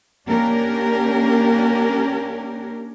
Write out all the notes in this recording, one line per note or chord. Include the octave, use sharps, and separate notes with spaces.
A#3 C#4 D4 G4 A#4